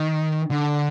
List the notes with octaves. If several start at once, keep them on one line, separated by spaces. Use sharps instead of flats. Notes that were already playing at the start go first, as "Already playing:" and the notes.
Already playing: D#3
D3